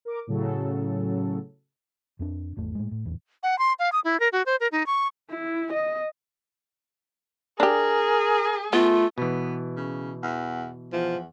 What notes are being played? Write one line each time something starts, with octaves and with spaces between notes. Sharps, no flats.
A#4 D6
A2 C#3 F#3 A4
F2 C4 D4
G#1 E2 A3
A2 G#3
A2
D1 B1 E2
F#5
C6
F5
D#6
E4
A#4
F#4
C5
A#4
D#4
C#6
E4
D#5
D4 G4 G#4 A#4
A3 B3 F4
B2 E3 B3
C#3
E2
E2 F3